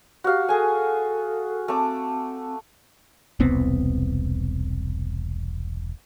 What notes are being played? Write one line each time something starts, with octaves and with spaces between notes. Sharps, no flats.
F#4 G4 F5
G#4 A4 G#5
A3 C4 D6
E1 C2 B3 C4